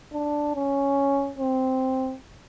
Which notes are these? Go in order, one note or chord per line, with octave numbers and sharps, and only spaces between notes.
D4
C#4
C4